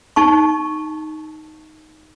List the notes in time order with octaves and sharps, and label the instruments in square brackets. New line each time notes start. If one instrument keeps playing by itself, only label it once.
[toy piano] D#4 A5 C#6